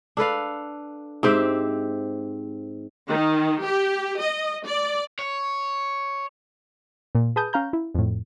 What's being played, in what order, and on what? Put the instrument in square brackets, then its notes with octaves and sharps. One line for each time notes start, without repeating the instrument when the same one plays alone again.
[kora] D4 A4 B4 F5
G#2 C4 G4 E5
[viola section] D#3
G4
D#5
D5
[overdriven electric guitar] C#5
[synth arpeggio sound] A#2
G#4 B4 A5 D#6 G6
C#4 F5 A#5 G6
E4
F2 A2